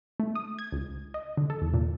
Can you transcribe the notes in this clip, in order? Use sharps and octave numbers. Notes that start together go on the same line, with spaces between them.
A3
D#6
G#6
C#2
D#5
D3
A4
E2
A#2